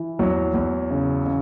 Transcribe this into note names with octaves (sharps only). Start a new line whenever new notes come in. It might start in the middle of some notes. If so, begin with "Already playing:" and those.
Already playing: E3
E2 F#3
E2
C#3
C#3